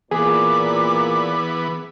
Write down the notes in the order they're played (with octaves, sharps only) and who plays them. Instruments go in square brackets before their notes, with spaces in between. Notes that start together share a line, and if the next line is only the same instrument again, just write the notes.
[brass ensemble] A#2 [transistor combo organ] E3 B3 [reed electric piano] G#4 [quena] D6